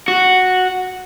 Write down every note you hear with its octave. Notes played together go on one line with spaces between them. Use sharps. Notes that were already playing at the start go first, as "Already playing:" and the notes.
F#4